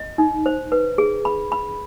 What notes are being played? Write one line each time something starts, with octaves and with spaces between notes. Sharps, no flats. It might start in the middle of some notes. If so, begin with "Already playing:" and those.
Already playing: D#5
D#4
C5
B4
G#4
B5
B5